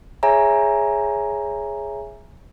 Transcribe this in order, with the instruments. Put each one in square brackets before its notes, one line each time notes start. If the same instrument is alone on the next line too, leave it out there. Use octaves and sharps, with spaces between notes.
[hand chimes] G#4 C#5 E5 G#5 A#5